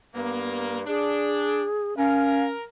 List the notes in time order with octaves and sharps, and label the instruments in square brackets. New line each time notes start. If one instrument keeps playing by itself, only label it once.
[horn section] G2 A#3 [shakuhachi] B3
[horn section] D4 [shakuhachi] G#4
[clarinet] C#4 [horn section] A#4 [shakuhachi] F5